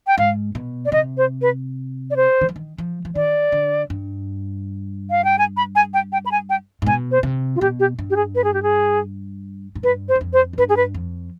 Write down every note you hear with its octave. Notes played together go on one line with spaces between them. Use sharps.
G5
G#2 F5
B2
D5
C3 D#5
C5
B4
D5
C5
D#3
F3
D#3
F3
F3
D#3 D5
D3
G2
F5
G5
G#5
B5
G#5
G5
G5
B5
G#5
G5
G#2
B2 G#5
C5
C3
F4
B2 G4
G4
G2
G4
G#4
B4
G#4
G4
G#4
G#2
G2 B4
C5
G2
F2
C5
G#2
G2 B4
G#4
B4
F2